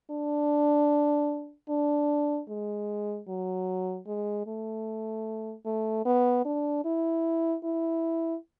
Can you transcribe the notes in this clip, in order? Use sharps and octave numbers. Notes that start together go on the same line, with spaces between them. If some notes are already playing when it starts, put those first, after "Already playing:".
D4
D4
G#3
F#3
G#3
A3
A3
B3
D4
E4
E4